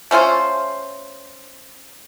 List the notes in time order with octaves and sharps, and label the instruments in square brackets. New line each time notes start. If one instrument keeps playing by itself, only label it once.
[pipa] A3 C#4 F4 C5